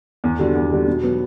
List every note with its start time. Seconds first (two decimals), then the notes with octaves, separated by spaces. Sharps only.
0.24 E2
0.39 D3 G3 D4 F#4
0.55 E2
0.71 D3 G3 D4 F#4
0.87 B2
1.03 F#3 B3